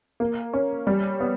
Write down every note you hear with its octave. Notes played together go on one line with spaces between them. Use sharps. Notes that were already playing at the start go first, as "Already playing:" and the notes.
A#3
C#4
G3
B3